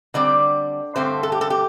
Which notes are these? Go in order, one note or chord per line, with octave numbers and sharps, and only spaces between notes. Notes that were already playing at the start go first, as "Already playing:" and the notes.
D3 G3 C4 D5
G2 D3 A3 C4 C5
A4
G4
A4
G4